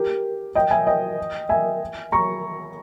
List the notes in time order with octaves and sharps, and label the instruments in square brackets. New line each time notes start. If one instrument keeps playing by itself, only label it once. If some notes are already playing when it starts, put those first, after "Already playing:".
Already playing: [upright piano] G4 A#4
D#5 G5
E5 G#5
D#5 G5
E5 G#5
A#5 C#6